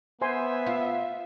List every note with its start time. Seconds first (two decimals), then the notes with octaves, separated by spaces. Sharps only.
0.22 B3 C5 E5 G#5 C6
0.66 F4